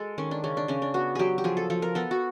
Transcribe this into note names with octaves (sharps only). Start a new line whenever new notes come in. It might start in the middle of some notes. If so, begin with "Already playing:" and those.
Already playing: G#3 A4
D#3 C#4
D4
C#3 C#4
D4
C#3 C#4
D4
B3 F#4
F#3 G4 G#4
G4
F3 G#4
A4
F3 A4
A#4
B3 A4
F#4